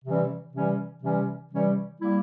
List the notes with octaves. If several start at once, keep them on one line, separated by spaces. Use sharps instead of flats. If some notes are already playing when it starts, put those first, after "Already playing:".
C3 E3 G3 C#4
C3 E3 G3 C#4
C3 E3 G3 C#4
C3 E3 G3 C#4
G3 A#3 E4